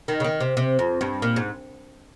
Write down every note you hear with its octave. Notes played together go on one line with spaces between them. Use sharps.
D#3
C#3
D#3
C3
C3
F2
G2
A#2
G#2